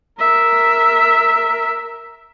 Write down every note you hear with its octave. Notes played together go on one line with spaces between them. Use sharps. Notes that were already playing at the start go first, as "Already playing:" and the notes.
A#4 E5